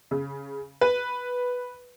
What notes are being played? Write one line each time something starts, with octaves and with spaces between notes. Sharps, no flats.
C#3
B4